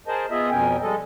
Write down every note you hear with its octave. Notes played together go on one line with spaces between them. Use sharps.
G#4 A#4 C5 D#5 A5
B3 F4 G#4 D#5 E5
F2 B2 C#4 A#4 G5 G#5
G3 G#3 A4 D#5